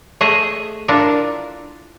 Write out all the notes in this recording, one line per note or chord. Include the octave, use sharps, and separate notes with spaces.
A3 G#4 D#5 E5
D4 E4 F4 A4 A#4